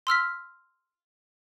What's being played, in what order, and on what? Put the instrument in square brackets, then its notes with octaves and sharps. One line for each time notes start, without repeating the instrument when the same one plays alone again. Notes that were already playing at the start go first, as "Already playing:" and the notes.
[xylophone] C6 E6 F6 B6